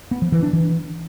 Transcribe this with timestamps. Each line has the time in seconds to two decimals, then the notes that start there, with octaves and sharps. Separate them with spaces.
0.11 B3
0.22 F3
0.32 E3
0.43 D4
0.53 E3